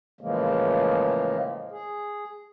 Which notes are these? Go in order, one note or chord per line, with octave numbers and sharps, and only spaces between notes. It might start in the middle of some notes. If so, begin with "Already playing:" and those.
A2 C#3 E3 F3 G#3 A#3
G#4